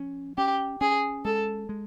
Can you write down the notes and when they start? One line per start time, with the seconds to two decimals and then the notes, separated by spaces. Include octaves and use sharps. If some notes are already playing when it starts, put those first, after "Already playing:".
Already playing: F3 C#4
0.38 C#4 G4
0.81 C#4 G#4
1.25 G#3 A4
1.69 G#3